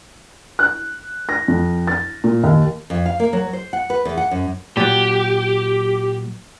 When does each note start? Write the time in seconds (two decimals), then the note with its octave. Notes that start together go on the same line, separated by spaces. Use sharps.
0.59 F#6
1.29 A#6
1.48 F2
1.87 A6
2.24 A#2
2.43 D#2
2.90 F2
3.06 F5
3.20 A#3
3.33 F#3
3.53 C5
3.73 F#5
3.90 B4
4.05 E2
4.17 F#5
4.31 F#2
4.77 A#2 F#3 G4